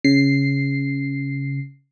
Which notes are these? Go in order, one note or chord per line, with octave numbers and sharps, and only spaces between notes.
C#3 C7